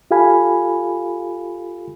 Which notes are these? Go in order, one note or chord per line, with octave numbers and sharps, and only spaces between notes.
F4 G4 A4 F5 G#5 B5